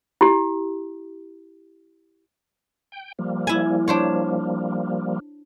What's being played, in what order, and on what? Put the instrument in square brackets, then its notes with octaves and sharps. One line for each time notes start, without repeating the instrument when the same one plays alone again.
[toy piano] E4 G4
[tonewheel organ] G5
F3 G3 A#3
[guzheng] E4 G#5
D4 C5 C#5